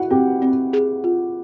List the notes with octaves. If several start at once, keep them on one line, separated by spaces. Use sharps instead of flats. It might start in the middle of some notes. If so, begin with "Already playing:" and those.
Already playing: E4 F#4 F#5
C4 G4 G5
C4
G#4
F4